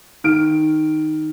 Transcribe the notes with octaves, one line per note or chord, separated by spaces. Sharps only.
D#3 F6 D7